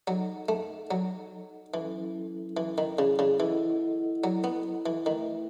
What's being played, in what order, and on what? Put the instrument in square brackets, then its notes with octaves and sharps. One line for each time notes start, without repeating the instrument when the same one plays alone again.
[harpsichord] F#3 [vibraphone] D#4 A4 D#5 F#5
[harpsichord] A3
F#3
[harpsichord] E3 [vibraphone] F#3 C#4 E4 A4
[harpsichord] E3
D#3
C#3
C#3
[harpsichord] E3 [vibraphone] E4 A4 D#5 F#5
[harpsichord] F#3
B3
E3
[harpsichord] D#3 [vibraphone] A3 E4 B4 E5